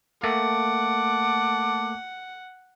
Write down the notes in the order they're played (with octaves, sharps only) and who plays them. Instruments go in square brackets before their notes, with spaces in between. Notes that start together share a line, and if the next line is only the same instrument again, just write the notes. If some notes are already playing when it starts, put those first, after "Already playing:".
[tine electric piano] A3 A#3 [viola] F#5 [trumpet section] A5 D6